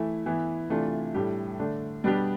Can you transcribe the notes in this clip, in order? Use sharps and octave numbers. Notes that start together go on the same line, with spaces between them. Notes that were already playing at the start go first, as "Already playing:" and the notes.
Already playing: E3 A3 E4
E3 B3 E4
C3 E3 A3 D4 F4
A2 G3 D4 G4
D3 A3 D4
B2 G3 B3 D4 G4